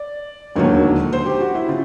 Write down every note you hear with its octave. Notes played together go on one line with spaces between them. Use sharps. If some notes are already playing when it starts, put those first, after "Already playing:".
Already playing: D5
E1 D#2 D3 F#3 A#3 C#5
C5
G4
F#4
E4
C#3 F4